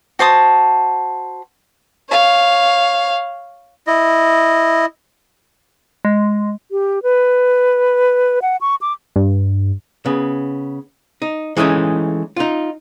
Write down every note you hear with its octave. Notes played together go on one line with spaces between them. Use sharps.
F#4 C5 A5 D#6
C#5 F5
E4 D#5
G#3
G4
B4
F#5
C#6
D6
G2
C#3 B3
D#4
E3 G#3 A3 C#4 D#4
D#4 F4